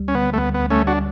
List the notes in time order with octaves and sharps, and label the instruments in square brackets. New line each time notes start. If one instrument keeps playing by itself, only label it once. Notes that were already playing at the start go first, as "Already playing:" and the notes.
Already playing: [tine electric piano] D2 G3
[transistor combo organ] C#4
[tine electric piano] D3 [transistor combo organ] B3
[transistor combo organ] A3
[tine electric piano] D2 [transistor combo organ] B3
[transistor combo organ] B3
[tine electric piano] D2
[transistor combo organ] A3 C#4
[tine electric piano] G3
[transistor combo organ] D4 F#4